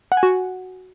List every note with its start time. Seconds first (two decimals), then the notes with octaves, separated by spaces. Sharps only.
0.12 F#5
0.17 G#5
0.23 F#4